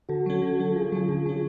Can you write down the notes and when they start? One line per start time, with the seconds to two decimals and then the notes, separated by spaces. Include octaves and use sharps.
0.09 D3 F#4 A4
0.26 F#3 C#4
0.42 D3
0.59 F#3 C#4
0.76 D3 F4 G#4
0.92 F#3 C#4
1.09 D3
1.26 F#3 C#4